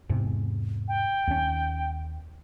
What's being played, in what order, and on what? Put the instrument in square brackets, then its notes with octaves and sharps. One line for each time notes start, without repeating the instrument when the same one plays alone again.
[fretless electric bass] E2 G#2 C3
[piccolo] G5
[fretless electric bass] D#2 C#4